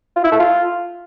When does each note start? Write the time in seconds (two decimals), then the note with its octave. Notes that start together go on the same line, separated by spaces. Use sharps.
0.16 F4
0.24 E4
0.32 A3
0.40 F4